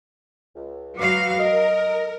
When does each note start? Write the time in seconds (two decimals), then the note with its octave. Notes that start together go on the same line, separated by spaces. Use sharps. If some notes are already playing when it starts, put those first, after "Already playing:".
0.56 C#2
0.98 F#3 F#4 B4 F5 D6
1.39 A#4 D#5